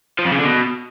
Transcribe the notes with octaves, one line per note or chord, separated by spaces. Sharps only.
F3
F2
C#3
D3
B2